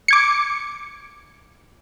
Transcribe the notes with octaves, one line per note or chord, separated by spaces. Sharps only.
D6 G#6 C#7